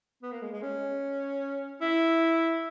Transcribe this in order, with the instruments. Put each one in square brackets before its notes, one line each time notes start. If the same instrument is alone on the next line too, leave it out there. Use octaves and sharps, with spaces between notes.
[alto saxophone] B3
A#3
G#3
G#3
C#4
E4